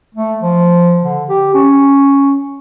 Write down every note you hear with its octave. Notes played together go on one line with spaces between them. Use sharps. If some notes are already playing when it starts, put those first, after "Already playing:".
A3
F3
D3
G4
C#4